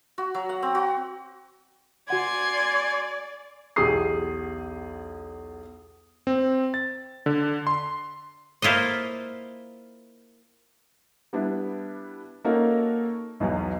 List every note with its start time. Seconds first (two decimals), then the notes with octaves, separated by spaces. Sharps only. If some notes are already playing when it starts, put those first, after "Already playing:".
0.18 F#4
0.35 F#3
0.49 F#5
0.62 C4
0.75 F#4
2.10 F#4 D5 F#5 G#5 C6 G#6
3.76 B1 E2 G4 G#4 D#6 C7
6.27 C4
6.74 A6
7.26 D3
7.67 C6
8.62 A#3 E4 F4 C5 D#5
11.33 G3 B3 D4 E4
12.45 A#3 C#4 D#4 F#4 A4 A#4
13.40 B1 E2 B2 F#3